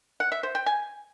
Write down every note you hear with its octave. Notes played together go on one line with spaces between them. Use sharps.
F#5
E5
C5
G5
G#5